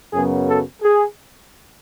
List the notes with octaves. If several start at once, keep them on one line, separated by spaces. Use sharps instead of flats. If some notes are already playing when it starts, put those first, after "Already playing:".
F#2 C#3 F#3 B3 G#4
A4
G#4